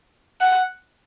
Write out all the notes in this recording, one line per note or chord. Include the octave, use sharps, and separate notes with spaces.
F#5